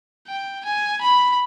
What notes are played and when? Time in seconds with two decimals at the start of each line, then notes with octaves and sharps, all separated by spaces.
0.28 G5
0.65 G#5
1.01 B5